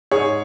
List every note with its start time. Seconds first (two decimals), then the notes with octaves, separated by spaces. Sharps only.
0.11 G#2 G#4 C#5